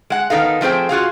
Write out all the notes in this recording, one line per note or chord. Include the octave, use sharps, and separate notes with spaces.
G#3 F#5
D#3 B3 D#4 A4 F5
F3 A3 C4 G#4 C5 G5
F4 F#4 G#4 F5